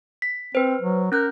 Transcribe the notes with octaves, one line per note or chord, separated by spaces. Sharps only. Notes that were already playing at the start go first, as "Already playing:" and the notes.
B6
C4 B4 C5
F#3
C#4 A#4 F#6 G6